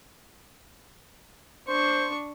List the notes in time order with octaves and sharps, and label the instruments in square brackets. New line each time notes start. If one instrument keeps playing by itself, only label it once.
[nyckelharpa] D4 C#6 [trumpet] C5